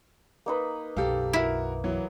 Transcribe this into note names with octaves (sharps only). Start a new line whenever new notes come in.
A#3 D#4 B4
B1 F#2 G4 A4 F5
E4 F#4 A#4
E3 F#3